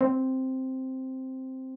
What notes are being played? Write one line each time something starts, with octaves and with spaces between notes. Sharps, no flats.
C4